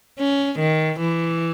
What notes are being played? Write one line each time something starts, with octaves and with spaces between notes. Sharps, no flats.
C#4
D#3
E3